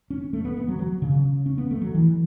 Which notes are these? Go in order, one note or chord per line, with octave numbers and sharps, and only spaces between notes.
C#4
A3
B3
B3
F#3
F#3
C#3
C#4
B3
A3
F#3
E3